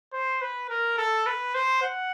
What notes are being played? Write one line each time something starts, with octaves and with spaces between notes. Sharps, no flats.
C5
B4
A#4
A4
B4
C5
F#5